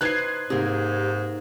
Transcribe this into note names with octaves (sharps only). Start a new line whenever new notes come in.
D#4 B4 C5 F#6 G#6 C7
G#2 C3 A#3 G#4